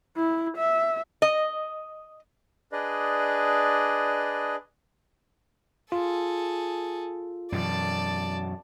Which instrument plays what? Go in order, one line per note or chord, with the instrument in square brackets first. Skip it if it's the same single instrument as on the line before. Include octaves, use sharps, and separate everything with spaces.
[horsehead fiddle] E4
E5
[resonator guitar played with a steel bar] D#5
[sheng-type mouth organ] D4 G#4 B4 D5 D#5
[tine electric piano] F4 [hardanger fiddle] G#4 A4
[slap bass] F#2 B2 E3 [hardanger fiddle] D5 A5